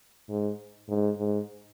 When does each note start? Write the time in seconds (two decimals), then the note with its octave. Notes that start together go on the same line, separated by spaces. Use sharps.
0.29 G#2
0.88 G#2
1.18 G#2